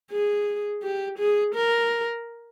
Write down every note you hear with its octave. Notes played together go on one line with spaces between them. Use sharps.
G#4
G4
G#4
A#4